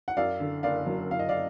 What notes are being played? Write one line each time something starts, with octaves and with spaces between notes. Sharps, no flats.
F#5
F#2 D5 F5
D3
F#1 D5 F5
F#3
F#1 F5
D#5
D5 F5